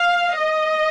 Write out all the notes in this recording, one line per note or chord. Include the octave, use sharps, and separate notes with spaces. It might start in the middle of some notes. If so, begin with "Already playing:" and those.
Already playing: F5
D#5